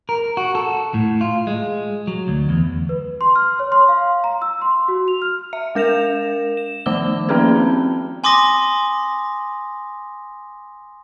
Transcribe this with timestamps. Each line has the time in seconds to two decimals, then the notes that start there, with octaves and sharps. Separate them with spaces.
0.09 A#4
0.37 F#4
0.55 A4
0.94 A2
1.21 F4
1.47 G#3
2.07 F#3
2.28 D2
2.49 E2
2.89 B4
3.21 C6
3.36 F6
3.60 C#5
3.72 C6
3.88 F5
4.24 A#5
4.42 E6
4.62 C6
4.88 F#4
5.08 F7
5.22 F6
5.53 E5
5.75 G#3 A#4 A#6 E7 F7
6.57 E7
6.86 D#3 F3 A3 D6 E6 G7
7.29 F3 A#3 C#4 G#4 B4
7.56 C4
8.24 G#5 C6 D6 D#6 A#6